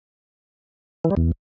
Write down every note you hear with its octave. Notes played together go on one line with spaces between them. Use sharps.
E3
G3
E2